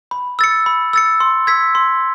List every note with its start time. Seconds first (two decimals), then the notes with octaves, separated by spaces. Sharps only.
0.11 B5
0.39 E6 A6 C#7
0.66 B5
0.93 E6 A6 C#7
1.20 C6
1.47 E6 G#6 B6
1.75 C6